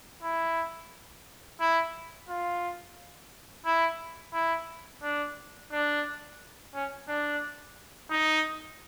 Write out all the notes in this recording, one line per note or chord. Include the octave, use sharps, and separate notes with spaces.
E4
E4
F4
E4
E4
D4
D4
C#4
D4
D#4